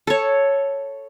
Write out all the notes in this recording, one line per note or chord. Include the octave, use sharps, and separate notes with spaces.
A4 C#5